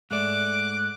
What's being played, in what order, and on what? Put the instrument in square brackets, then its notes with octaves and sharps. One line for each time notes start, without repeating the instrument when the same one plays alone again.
[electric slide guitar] G#2 A3 D5 [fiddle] D6 [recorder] F#6